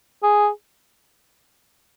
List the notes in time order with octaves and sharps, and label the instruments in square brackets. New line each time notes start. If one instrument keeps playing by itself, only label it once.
[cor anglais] G#4